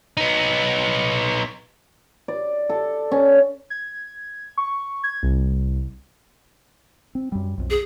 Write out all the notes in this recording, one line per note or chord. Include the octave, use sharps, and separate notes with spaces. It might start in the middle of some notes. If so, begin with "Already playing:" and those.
B3 D#4
D5
A4
C#4
G#6
C#6
G#6
C2
C4
F#2 G3
B1 F2
G#4